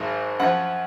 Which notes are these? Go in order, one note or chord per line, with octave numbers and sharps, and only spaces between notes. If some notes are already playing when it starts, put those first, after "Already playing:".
Already playing: G#1 G#2 D#3 F#3
F#2 F3 F#5